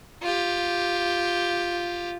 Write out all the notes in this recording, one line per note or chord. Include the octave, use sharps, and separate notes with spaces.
F4 G4